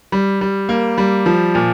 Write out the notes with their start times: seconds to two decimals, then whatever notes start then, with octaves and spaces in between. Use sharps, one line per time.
0.12 G3
0.41 G3
0.69 A#3
0.98 G3
1.26 F3
1.55 A#2